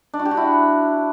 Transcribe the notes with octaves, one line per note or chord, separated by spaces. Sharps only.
D4
F#4
G4
F#4
E4